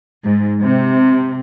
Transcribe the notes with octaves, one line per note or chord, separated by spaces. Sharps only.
G#2
C3